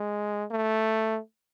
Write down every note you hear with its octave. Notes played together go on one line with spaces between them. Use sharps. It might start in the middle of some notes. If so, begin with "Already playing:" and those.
Already playing: G#3
A3